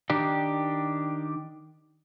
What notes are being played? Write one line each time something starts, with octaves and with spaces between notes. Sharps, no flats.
D#3 D4 G4